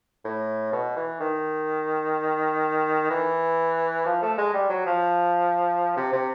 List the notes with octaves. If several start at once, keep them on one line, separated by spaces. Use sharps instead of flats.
A2
B2
E3
D#3
E3
F3
A3
G#3
G3
F#3
F3
C3
C3